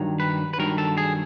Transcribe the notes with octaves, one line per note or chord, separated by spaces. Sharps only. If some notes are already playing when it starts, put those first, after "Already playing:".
Already playing: G2 D#3 F#3
B4
B4
G2 D#3 F#3 A#4
A4
G#4